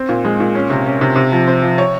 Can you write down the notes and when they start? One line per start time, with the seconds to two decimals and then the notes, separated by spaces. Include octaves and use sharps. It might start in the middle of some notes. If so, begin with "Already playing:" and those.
Already playing: C4
0.09 A#2
0.25 G#3
0.40 A#2
0.55 C#4
0.70 C3
0.86 C#4
1.01 C3
1.16 C3
1.32 F3
1.48 C4
1.62 F3
1.78 C#5